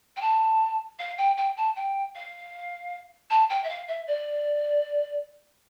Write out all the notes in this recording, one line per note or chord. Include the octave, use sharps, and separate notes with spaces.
G5
A5
F5
G5
G5
A5
G5
F5
A5
G5
E5
F5
E5
D5